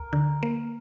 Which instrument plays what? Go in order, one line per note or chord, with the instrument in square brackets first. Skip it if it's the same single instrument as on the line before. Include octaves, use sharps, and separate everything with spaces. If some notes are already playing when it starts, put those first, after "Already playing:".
Already playing: [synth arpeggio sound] D2 [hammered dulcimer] A#4
[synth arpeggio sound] D3
A#3